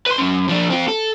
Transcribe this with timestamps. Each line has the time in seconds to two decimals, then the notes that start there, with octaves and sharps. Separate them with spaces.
0.06 B4 C6
0.18 F#2 C#4
0.49 F3 D4
0.70 C4 F4
0.88 A4